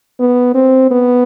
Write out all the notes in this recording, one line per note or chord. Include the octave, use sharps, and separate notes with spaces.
B3
C4
B3